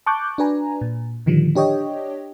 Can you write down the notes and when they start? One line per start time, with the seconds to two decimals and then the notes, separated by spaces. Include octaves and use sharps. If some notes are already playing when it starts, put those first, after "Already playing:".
0.06 A5 C#6 D6 F#6 G6
0.38 D4 F#4 B4 G#5 A#5
0.81 A#2
1.26 A2 D3 D#3 F3 G3
1.55 D4 G4 C#5 D#5 G5